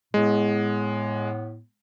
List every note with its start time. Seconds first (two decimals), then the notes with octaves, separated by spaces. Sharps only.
0.14 A2 G#3 B3